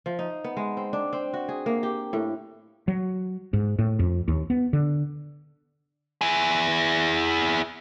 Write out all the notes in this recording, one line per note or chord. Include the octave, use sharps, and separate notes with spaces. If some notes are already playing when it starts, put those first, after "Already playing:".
F3
D#4
B3
G#3
C4
D4
C4
F#4
G#4
A#3
G4
A2
F#3
G#2
A2
F2
D#2
B3
D3
E4 G#4